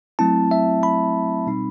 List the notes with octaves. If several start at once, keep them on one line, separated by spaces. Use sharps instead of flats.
F#3 A3 C4 E4 A5
E5
B5
B2 G3 C4 D#4